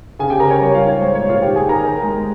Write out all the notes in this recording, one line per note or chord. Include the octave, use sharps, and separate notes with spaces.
C#3 G#4 G#5
G4 G5
C#3 A#4 A#5
C#5
G3 C#5
F4 F5
G#2
C#5
G#3 C5
C#5
A#2
F4 F5
D#3 G4 G5
G#4 G#5
D#3
A#4 A#5
D#4
G#3